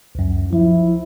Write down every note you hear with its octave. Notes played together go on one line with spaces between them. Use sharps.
C#2 F#2
F3 E4